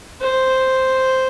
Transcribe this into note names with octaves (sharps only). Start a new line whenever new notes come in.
C5